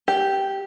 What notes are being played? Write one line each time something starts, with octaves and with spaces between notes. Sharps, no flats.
G4